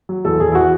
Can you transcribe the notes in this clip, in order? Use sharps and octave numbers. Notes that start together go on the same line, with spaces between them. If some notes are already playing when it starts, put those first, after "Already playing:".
F#3
E2 A4
E2 G#4
E4
E3 F#4